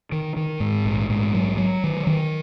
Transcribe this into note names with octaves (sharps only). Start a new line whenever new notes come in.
D#3
D#3
G#2
A#1
G#2
F#3
F#3
D#3
D#3